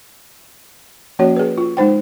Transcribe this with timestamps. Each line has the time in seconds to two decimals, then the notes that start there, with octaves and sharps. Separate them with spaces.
1.19 F3 A#3 C#4 F#4 C#5
1.36 G#4 B4
1.58 F4
1.77 G#3 D#4 C5 G5